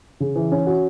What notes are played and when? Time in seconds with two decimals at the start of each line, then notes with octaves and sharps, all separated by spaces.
0.20 C#3
0.36 E3
0.52 C#4
0.67 F#4